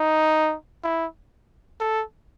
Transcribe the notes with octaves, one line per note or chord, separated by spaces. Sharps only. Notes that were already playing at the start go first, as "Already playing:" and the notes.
Already playing: D#4
E4
A4